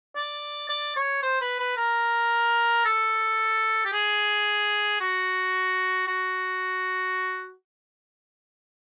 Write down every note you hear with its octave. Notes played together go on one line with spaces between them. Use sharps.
D5
D5
C#5
C5
B4
B4
A#4
A4
G4
G#4
F#4
F#4